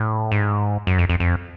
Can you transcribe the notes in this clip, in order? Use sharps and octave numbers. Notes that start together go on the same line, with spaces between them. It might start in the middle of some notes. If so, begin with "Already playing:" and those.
Already playing: A2
G#2
F#2
F2
F2
F2